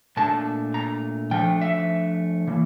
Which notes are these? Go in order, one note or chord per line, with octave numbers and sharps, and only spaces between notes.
A#2 A3 D4 A5
A#5
F3 A3 D4 G5
E5
E3 A#3